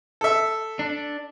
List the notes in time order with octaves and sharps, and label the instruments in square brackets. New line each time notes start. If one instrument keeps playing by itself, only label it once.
[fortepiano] A4 E5
[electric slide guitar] D4